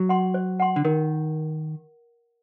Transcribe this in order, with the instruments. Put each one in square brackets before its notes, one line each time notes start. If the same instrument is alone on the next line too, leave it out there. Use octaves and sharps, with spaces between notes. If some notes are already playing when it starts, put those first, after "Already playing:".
Already playing: [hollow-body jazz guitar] F#3
[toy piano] F#5 C6
C5
F#5 C6
[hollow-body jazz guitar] D3
[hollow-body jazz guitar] D#3 [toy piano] A#4